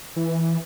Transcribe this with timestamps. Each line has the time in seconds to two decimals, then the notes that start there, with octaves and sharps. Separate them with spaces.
0.16 E3